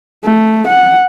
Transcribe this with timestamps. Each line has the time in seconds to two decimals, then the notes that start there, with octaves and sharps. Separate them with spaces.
0.25 A3
0.68 F#5